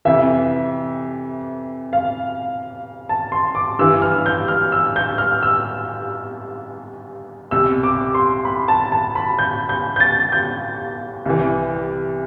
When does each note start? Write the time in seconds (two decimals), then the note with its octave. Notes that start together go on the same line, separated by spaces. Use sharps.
0.05 F2 C3 E3 E5
1.93 F5
3.09 A5
3.32 C6
3.55 D6
3.79 G2 E3 E6
4.02 F6
4.26 G6
4.48 F6
4.72 E6
4.96 G6
5.18 F6
5.43 E6
7.51 C2 B2 E6
7.83 D6
8.15 C6
8.45 B5
8.68 A5
8.92 A5
9.15 B5
9.39 G6
9.69 G6
9.96 G6
10.00 A6
10.32 G6
11.26 C2 C3 E3